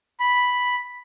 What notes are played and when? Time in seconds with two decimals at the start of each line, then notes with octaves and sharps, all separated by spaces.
0.20 B5